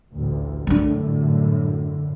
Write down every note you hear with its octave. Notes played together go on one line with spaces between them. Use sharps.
A1 D2
F#2 A2 D3 G3 D4